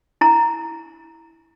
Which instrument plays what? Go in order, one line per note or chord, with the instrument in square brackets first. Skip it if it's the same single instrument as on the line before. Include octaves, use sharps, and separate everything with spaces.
[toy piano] E4 A#5